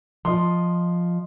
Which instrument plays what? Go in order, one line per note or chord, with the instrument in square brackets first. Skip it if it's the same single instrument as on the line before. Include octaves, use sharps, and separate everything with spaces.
[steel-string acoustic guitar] F3 D#5 [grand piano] C6